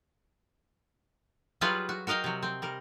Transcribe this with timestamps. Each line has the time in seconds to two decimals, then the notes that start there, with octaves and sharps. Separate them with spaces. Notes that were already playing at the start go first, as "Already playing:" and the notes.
1.61 F#3 G3 F4 G#4 B4
1.89 F#4
2.07 F#4 A#4 D#5 F5 G5
2.24 C3 F#3
2.43 C4
2.62 G3 A#4